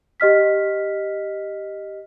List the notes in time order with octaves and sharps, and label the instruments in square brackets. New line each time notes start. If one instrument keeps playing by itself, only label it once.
[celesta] G4 D#5 F6 B6